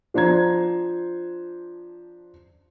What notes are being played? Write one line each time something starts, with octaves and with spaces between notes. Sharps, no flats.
F3 D4 C5 A#5 G#6